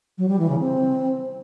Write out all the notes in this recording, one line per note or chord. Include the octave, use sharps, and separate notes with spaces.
F#3
G3
E3
C#3
C4